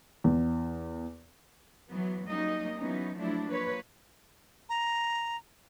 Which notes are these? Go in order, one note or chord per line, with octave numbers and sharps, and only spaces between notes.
E2
E3 F#3 B3
F#3 G3 A#3 C#4 D#4 D#5
E3 F#3 B3 C#4 D#4
F3 F#3 A3 D4 E4
F3 A#3 B4 C#5
A#5